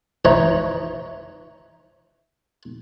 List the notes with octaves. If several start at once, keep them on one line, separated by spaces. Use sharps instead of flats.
E3 D#4 C#5 A#5